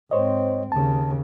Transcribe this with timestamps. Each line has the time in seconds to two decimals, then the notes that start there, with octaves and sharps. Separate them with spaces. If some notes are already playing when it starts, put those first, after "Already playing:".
0.11 G#2 C4 C5 C#5 D#5
0.72 D#2 C#3 A5